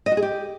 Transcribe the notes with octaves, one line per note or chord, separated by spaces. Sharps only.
D#5
F#4
G#4
G4